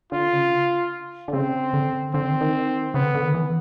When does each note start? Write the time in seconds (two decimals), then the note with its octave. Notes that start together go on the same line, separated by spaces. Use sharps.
0.12 D3 F4
0.32 C#3
1.28 D3
1.32 C#3 C4
1.74 D3
2.14 D3 C4
2.27 D#3
2.41 D#3
2.94 C#3 B3
3.04 D3
3.15 D3
3.24 D#3
3.34 E3